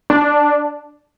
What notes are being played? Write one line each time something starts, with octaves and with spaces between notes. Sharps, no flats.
D4